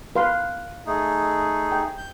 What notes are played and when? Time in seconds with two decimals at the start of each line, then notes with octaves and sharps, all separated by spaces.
0.16 B4 F5 C6
0.86 A3 D#4 G#4
1.72 G5
1.97 G6